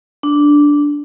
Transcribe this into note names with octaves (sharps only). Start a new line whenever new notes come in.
D4